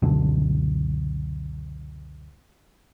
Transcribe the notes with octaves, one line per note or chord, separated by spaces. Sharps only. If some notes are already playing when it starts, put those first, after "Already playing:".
C#2 F#2 B2 D3